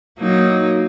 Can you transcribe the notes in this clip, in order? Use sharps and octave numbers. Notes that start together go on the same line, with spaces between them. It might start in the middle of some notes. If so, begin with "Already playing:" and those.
F#3 A#3 D#4